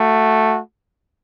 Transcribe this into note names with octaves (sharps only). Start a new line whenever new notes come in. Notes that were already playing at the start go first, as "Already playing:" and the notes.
Already playing: A3 F#4